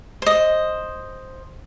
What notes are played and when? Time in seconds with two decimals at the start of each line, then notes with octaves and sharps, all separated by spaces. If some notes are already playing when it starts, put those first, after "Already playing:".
0.22 C5 D#5